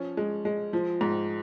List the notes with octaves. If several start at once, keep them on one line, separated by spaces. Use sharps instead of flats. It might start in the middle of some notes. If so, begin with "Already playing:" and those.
Already playing: F3 C#4
G#3
G#3
F3
G#2